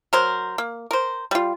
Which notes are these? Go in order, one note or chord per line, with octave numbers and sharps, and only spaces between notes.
F#3 A#4 C5
A#3
A#4 C5
G3 F4